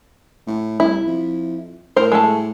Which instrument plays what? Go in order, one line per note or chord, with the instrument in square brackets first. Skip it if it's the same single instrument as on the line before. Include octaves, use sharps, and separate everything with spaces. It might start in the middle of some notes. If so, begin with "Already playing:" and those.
[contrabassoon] A2
[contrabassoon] C2 [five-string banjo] E4
[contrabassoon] F2
[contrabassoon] A2 [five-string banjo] A#4 C5
[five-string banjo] G#3 A3 A5